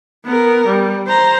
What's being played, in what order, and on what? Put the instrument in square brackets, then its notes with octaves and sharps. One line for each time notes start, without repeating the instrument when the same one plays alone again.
[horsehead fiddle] B3 A#4
G3
C5 A#5